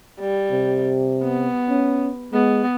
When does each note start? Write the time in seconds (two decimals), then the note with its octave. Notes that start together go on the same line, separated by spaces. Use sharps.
0.20 G3
0.52 C3
1.23 B3
1.69 C#4
2.33 G#3 B3